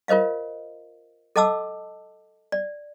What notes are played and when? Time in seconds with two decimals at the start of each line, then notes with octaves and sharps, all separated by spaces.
0.08 F4 A#4 C5 D#5 F5
1.36 A4 D#5 F#5 A5 D6 E6
2.52 D5